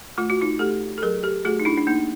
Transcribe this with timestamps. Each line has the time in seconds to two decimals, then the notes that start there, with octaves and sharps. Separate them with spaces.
0.18 A3 F4
0.30 F#4
0.41 D#4 F4
0.59 A3 G4 A4
0.98 A4
1.02 F#3 G#4 A#4
1.23 G4 A4
1.45 A3 F#4 G#4
1.60 D#4
1.65 D4 E4
1.77 D4
1.87 A#3 D#4